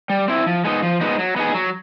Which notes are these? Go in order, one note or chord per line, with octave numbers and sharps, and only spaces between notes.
G3
C4 E4
F3
G#3 B3 D#4
F3
G#3 B3 D#4
F#3
B3 D#4 G#4
F#3